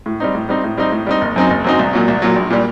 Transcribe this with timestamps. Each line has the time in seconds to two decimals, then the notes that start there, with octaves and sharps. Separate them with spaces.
0.06 A2
0.20 G3 C4 D#4
0.35 A2
0.49 G3 C4 D#4
0.64 A2
0.78 G3 C4 D#4
0.92 A2
1.07 G3 C4 D#4
1.21 F#1
1.36 F#2 F#3 C4 D#4
1.50 F#1
1.64 F#2 F#3 C4 D#4
1.79 C2
1.93 A#2 F#3
2.08 C2
2.22 A#2 F#3
2.36 A#1
2.50 A#2 G3